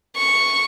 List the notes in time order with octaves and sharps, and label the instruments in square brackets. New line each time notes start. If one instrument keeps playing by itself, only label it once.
[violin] C#6